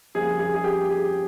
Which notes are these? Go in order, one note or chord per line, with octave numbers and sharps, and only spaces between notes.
F2 C#3 G3 A#3 G#4
G#4
G#4
G4
G#4